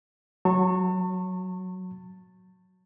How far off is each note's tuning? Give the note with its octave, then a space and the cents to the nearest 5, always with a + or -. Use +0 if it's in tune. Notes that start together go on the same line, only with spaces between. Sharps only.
F#3 +0 A5 +40 C#6 -15